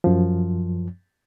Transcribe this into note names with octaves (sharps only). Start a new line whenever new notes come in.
F#2 F3